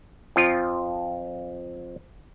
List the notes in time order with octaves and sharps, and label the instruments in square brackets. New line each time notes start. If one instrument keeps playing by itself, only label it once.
[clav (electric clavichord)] F2 F3 F4